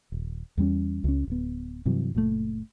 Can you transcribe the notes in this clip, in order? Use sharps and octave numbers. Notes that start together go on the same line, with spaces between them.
D#1
E2 G3 B3 C#4
C#2 C#4
D1 B3
G2 C3 E3 F#3
F#1 A#2 D#3 A3